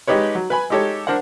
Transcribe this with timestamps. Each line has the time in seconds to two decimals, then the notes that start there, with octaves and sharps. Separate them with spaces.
0.07 G#3 D#4 G4 B4 C#5
0.35 F#3
0.50 B4 G#5 B5
0.70 G#3 D#4 G4 A4 C#5
1.07 D4 A#4 C5 F#5